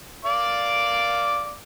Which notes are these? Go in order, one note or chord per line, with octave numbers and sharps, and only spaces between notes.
D5 F5 D6